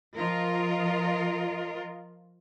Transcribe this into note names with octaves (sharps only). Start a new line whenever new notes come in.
F3 F4 A#4 D#5